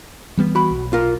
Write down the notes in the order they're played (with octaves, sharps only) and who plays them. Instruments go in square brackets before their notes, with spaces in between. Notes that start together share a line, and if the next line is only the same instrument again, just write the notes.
[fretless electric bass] E3 G3 B3
[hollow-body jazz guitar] F#4 B5
[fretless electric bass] B1
[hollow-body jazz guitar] F4 A#4